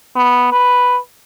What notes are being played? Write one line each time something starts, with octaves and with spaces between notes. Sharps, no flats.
B3
B4